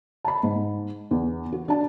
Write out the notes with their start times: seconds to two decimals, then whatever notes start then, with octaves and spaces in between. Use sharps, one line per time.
0.25 A5 B5
0.43 G#2
1.11 E2
1.52 F#4
1.68 D4 A5